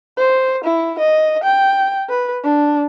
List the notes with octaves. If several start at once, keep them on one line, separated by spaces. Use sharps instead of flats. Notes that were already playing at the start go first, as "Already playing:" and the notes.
C5
E4
D#5
G5
B4
D4